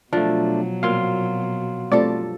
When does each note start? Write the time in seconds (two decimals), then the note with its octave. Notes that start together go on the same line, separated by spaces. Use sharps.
0.13 B2 F3 F#3 A3 D4
0.83 A#2 C4 F5 G5 C6
1.92 G2 F3 A3 C4 A4 D5